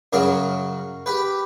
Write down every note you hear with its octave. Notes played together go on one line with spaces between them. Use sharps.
F#2 C#3 F#3 F#4 A#4
G4 B4